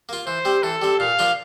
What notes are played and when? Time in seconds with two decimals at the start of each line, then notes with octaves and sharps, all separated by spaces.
0.09 A#3 F4
0.27 E3 C5
0.45 G3 C4
0.63 E3 A4
0.82 G3 C4
1.00 A#2 F5
1.19 F3 A#3 D4 F4